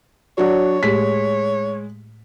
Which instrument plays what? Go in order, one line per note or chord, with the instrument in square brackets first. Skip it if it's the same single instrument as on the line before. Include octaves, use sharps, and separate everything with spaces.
[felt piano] F#3 D4 F#4 [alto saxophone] C#5
[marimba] A2 A3 G4 [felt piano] G#3 B6